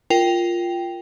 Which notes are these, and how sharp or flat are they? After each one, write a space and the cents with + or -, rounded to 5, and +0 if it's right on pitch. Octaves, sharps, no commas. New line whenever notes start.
F4 -5 A#4 +0 G5 +0